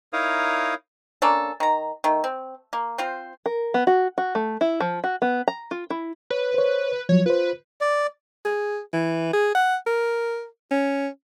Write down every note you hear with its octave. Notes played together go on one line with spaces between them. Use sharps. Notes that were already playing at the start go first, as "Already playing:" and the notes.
D#4 E4 A#4 C#5 F5 D#6
A#3 C#4 D4 A4
D#3 A#5
D#3 A3
C4
A#3
C4 F4 C5
A#4
B3
F#4
F#4
A3
E4
F3
F#4
B3
A#5
F4
E4
B4 C#5
C5 C#5
F3 F#3 C#5
F4 B4 C5
D5
G#4
E3
G#4
F#5
A#4
C#4